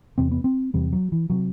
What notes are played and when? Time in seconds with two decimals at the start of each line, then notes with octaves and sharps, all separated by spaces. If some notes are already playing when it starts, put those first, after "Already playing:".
0.18 E2 C3 C4
0.31 B3
0.44 C4
0.74 E2 C3 G3
0.93 F#3
1.12 E3
1.30 C3 F#3